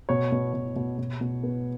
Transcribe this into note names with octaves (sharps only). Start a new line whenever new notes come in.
B2 C#5
B2
B2
B2
B2
B2
B3